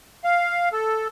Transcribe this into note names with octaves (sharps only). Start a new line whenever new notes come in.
F5
A4